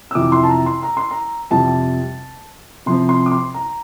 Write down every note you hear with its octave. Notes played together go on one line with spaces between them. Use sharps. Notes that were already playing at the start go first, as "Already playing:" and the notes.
E6
F2 C3 E3 D6
C6
A5
A#5
C6
A#5
C6
A#5
F2 C3 G3 A5
C3 F3 C4 C6
C6
D6
C6
A#5